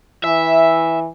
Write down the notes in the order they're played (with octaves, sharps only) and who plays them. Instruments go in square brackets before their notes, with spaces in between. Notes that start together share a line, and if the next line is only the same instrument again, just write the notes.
[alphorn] E3 [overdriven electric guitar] E5